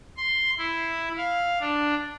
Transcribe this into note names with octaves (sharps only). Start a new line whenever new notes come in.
C6
E4
F5
D4